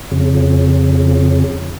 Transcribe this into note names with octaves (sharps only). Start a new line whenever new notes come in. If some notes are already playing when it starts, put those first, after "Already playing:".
F2 C#3